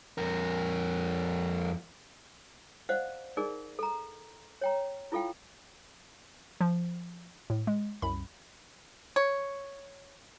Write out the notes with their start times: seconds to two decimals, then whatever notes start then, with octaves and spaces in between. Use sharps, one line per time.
0.18 F2 A#4
2.89 C5 D5 D#5 F5 F#5
3.37 D#4 G#4 A#4 D5
3.79 A4 A#5
4.61 C#5 G5 A#5
5.12 E4 F4 A4 F5 G5
6.61 F3
7.50 A2
7.67 G#3
8.02 C2 F#2 B5
9.16 C#5